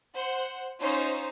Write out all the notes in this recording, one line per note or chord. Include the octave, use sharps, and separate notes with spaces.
C5 F#5
C#4 D#4 F4 C5 C#5